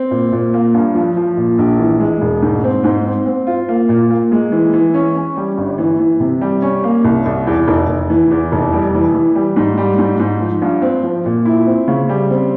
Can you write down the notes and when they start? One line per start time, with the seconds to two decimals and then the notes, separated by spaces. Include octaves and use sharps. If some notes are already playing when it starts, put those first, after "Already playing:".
Already playing: C4
0.11 A#2
0.32 A#2
0.54 A#3
0.74 G2
0.95 F3
1.16 F3
1.37 A#2
1.58 A#1
1.79 E3
2.00 G#3
2.21 E1
2.42 G#2
2.64 C4
2.84 G#2
3.05 C4
3.26 C4
3.47 F4
3.69 A#3
3.89 A#2
4.10 A#3
4.32 G#3
4.52 E3
4.73 E3
4.94 C#4
5.16 C#4
5.37 G3
5.57 G1
5.78 E3
5.99 E3
6.20 C3
6.41 G3
6.62 C#4
6.84 A#3
7.04 C2
7.26 C2
7.47 E2
7.68 F1
7.88 F1
8.10 E3
8.31 E2
8.52 F1
8.73 G3
8.94 E3
9.14 E3
9.35 G3
9.56 G#2
9.78 G3
9.98 G#2
10.19 G#2
10.40 F3
10.62 G2
10.82 C4
11.03 F3
11.25 A#2
11.45 E4
11.66 C4
11.88 C#3
12.09 G3
12.30 C4